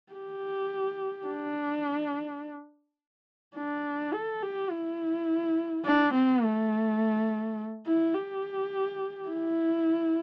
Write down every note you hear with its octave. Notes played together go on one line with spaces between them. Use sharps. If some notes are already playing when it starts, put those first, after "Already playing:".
G4
D4
D4
A4
G4
E4
D4
C4
A3
E4
G4
E4